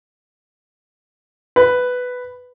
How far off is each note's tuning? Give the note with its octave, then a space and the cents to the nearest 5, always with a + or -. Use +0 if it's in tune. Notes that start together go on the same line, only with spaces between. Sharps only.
B4 +5